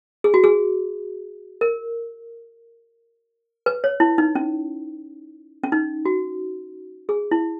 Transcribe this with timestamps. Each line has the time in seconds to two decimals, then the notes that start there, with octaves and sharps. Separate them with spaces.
0.24 G#4
0.34 F#4
0.44 G#4
1.61 A#4
3.66 B4
3.84 C#5
4.00 E4
4.18 D#4
4.35 C#4
5.63 C#4
5.72 D#4
6.05 F#4
7.09 G#4
7.31 E4